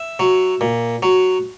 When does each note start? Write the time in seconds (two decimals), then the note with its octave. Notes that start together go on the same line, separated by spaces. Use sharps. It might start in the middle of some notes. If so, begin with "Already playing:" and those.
Already playing: E5
0.20 F#3
0.61 A#2
1.03 F#3